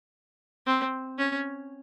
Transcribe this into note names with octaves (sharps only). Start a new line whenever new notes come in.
C4
C#4